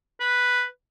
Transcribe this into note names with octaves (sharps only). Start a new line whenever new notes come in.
B4